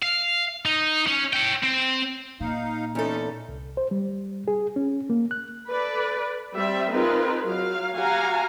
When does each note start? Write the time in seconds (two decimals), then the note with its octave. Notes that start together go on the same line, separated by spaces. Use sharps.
0.03 F5
0.65 D#4
1.07 C#4
1.33 C#5 G5
1.63 C4
2.41 A#2 D#4 F5
2.95 E2 A3 C#4 D#4 A4
3.49 C2
3.77 C5
3.91 G3
4.48 G#4
4.76 C#4
5.10 A#3
5.31 F#6
5.71 A4 B4 D5
6.53 G3 C4 E5
6.93 C4 D#4 F4 G#4 A#4 B4
7.46 F#3 F5
7.95 F#4 G4 F5 F#5 G#5 A#5